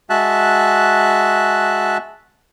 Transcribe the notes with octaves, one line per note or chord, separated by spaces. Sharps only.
G#3 F#4 E5 A5 F#6